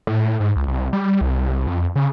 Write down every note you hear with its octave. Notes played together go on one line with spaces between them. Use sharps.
A2
G#2
C#2
C2
G3
C2
F2
C#3